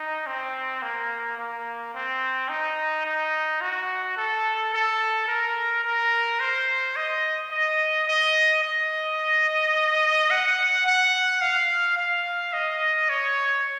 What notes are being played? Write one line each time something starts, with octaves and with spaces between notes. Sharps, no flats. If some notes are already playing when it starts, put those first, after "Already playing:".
Already playing: D#4
C4
A#3
A#3
C4
D#4
D#4
F#4
A4
A4
A#4
A#4
C5
D#5
D#5
D#5
D#5
F#5
F#5
F5
F5
D#5
C#5